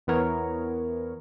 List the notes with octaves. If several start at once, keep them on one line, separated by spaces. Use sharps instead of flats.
E2 E3 B3 A#4 C#5